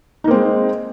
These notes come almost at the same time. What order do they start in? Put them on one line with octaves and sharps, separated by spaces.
D#4 A#3 C4 G#3